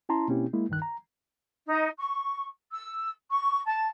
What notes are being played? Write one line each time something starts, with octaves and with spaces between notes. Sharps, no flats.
C#4 E4 A5 A#5 C6
B2 A#3 C4 C#4 E4 G4
G#3 A#3 E4
C#2 G2 D#3 F#6
A#5
D#4
C#6
E6
C#6
A5